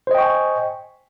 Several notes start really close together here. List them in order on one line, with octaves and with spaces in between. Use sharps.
C5 D#5 G5 C#6 G#5